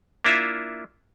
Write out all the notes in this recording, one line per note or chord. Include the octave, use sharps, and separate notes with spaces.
A#3 D4 E4 F4 E5